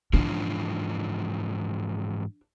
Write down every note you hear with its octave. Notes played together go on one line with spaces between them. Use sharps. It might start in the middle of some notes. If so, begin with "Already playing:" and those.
G#2 E3 F3 D4